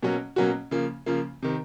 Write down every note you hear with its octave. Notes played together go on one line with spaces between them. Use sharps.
B2 F#3 A#3 C#4 F#4
B2 F#3 A#3 C#4 F#4
C#3 F3 A#3
C#3 F3 A#3
C3 D#3